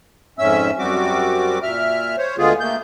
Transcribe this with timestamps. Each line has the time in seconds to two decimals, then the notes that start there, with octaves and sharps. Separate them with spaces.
0.39 F2 G#2 C#4 E5 E6
0.79 F#2 G3 C4 F#4 D6
1.63 A#2 E5 F6
2.18 C5 C#5
2.38 D2 D3 G#3 B3 F4 G#4
2.60 A3 A#3 G6